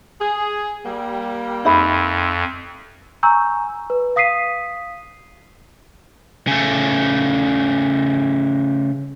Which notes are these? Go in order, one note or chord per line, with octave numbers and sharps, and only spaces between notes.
G#4
G3 A#3
F2 D#4 E5 B5
G#5 A#5 C#6 E6 G6
B4
F5 D#6 B6 C7 D#7
C#3 A3